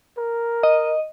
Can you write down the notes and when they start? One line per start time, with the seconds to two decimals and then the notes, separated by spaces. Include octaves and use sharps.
0.18 A#4
0.63 D#5